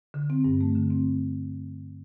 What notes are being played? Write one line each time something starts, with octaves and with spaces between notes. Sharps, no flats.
D3
C4
G2
A3
D3
C4